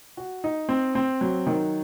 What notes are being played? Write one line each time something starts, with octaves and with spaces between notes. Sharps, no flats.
F#4
D#4
C4
C4
F#3
D#3